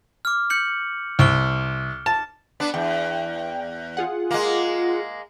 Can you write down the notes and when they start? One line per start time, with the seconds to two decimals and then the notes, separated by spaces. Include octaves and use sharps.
0.25 D6 F6
0.50 G6 C#7 F#7
1.19 C2 F6 D7 G7
2.06 A5
2.60 B3 D4 D5
2.74 E2 G5
3.97 F4 G#4 F#5
4.31 G#3 A#3